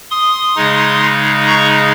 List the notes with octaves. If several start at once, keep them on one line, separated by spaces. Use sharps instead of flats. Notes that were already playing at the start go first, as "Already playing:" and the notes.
C6 D#6
C#3 G#3 D#4
A#5 C#6